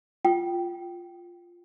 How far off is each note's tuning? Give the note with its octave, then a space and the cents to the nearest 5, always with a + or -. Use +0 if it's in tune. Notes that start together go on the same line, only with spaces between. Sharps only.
F4 +0 G5 -10